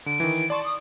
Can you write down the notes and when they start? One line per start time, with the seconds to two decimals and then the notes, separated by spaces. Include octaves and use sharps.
0.06 D3 D7
0.20 D#3 E3
0.50 D5 A5 C6 C#6
0.64 D#6